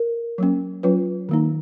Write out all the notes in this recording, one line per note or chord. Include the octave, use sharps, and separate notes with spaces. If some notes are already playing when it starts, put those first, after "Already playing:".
Already playing: A#4
F#3 A#3 C#4
F#3 C#4 F4 B4
D#3 A#3 D#4